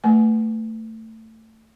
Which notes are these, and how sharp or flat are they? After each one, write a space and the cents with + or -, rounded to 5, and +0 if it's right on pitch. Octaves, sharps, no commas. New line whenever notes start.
A3 +20 B4 +0 G#5 +25